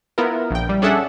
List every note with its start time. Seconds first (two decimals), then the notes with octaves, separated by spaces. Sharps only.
0.18 B3 E4 F4 A#4
0.51 A#1 G5
0.69 G3
0.82 C#4 D4 G#4 A4 E5 F#5